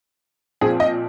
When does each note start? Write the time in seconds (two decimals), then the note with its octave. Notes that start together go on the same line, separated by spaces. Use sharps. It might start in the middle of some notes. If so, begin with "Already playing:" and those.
0.61 A#2 F3 C4 G#4
0.80 D#5